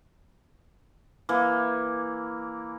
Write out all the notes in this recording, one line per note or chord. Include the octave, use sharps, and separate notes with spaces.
E3 A#3